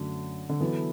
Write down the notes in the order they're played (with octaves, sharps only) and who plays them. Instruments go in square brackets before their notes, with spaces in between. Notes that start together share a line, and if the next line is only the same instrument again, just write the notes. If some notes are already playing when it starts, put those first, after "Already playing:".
Already playing: [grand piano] F#2 F#3 A3 D4 [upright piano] D3
[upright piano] D3
[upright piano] E3 [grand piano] F#3 B3 E4 A4